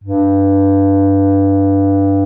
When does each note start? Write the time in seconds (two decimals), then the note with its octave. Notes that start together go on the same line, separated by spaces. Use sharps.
0.04 G2